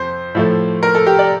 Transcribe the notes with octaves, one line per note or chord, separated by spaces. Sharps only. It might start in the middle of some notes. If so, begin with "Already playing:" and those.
Already playing: F2 C5
A2 F3 A3
A#4
A4
G4
D5